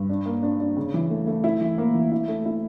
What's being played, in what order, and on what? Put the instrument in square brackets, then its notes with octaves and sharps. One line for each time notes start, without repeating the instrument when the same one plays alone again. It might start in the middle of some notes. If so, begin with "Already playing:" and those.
Already playing: [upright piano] G2
D4
A#3
D4
D4
C#3
E3
A3
A3
E4
E3
A#3
E3
E4
A3
E4